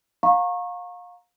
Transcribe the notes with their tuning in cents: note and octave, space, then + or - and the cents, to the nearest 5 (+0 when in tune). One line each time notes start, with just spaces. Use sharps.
F5 +30 A#5 +0 C#6 -25